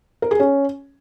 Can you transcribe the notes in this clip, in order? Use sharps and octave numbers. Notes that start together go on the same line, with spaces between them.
A#4
G#4
C#4